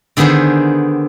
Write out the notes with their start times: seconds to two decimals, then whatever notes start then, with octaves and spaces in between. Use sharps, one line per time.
0.17 D3 D#3 B3 G#4 C5